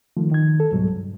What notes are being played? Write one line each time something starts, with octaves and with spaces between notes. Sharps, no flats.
D#3 F3 A3
D#3 G#6
A4
C#2 G#2 B2 F#3 G3
G2